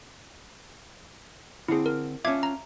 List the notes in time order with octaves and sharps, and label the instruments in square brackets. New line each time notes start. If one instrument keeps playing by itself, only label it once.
[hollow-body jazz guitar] D3 C4 [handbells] E4 G#4
[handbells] A#4
[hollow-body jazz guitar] C#4 D4 F4 [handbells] E5 D6 G#6
[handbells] A#5